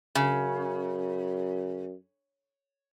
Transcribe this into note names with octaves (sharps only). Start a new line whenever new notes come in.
F#2 C#3